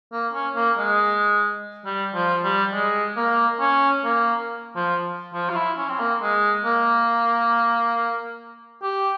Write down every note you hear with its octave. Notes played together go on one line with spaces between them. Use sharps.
A#3
C#4
A#3
G#3
G3
F3
G3
G#3
A#3
C#4
A#3
F3
F3
F4
E4
C#4
C4
A#3
G#3
A#3
G4